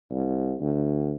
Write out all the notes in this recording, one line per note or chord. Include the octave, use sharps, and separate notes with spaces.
C2
D2